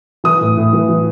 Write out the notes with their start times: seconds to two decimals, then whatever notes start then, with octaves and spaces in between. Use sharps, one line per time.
0.24 E3 D#6
0.41 A2
0.57 A2
0.73 E3
0.89 E3